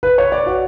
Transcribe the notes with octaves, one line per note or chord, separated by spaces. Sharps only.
B4
C#5
D5
F#4